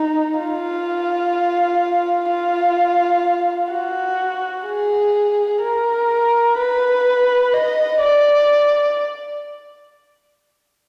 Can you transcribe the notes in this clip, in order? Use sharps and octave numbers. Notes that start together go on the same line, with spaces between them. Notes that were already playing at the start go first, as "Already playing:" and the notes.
Already playing: D#4
F4
F4
F#4
G#4
A#4
B4
D#5
D5